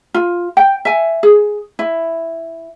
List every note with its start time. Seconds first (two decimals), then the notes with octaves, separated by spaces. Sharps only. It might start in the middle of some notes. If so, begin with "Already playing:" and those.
0.14 F4
0.57 G5
0.85 E5 G#5
1.23 G#4
1.79 E4